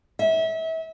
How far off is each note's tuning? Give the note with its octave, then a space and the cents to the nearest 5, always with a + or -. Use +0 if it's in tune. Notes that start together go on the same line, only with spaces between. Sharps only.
E5 -30